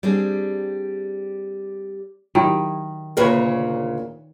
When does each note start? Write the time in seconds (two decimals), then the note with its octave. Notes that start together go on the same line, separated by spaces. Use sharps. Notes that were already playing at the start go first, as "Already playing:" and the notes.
0.03 G3 C4 D4 G#4
2.35 D#3 F#3 E4 G4
3.17 D2 A#2 C#3 A#4 B4 C#5